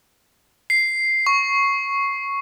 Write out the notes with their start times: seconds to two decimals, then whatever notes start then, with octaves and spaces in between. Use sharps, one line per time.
0.70 C7
1.27 C#6